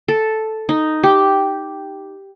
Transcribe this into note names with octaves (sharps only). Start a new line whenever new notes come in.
A4
D#4
G4